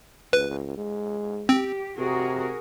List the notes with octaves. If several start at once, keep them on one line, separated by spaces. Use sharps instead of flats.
C#2 B4
G#3
C4 G4
C3 F#4 G#4 A#4